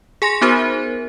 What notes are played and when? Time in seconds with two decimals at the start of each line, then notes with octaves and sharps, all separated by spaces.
0.22 G#4 G#5 C6 A#6
0.41 B3 D#4 F#4 A#4 C5